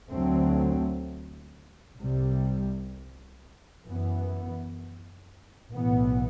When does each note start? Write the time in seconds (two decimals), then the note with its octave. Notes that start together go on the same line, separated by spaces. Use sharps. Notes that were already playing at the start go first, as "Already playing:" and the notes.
0.10 D2 D3 F#3 A3 C4
1.98 C2 C3 G3
3.84 F#2 E3 B3
5.71 B1 A2 E3 B3